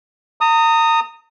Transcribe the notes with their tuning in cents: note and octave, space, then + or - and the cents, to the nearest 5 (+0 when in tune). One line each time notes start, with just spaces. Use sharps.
A#5 -35 D#6 +0